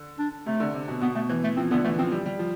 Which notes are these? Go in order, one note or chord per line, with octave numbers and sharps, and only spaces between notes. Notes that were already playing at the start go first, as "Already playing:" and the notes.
Already playing: D3
D4
C3 A3
D3
C3
B2
B2 B3
B2 A3
E3 A3
A3
F3 C4
D3 B3
E3 A3
F3 C4
G3
G3
F3